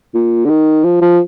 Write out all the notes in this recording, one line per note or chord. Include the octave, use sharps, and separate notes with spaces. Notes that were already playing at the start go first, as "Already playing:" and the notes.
A#2
D3
D#3
F3
F3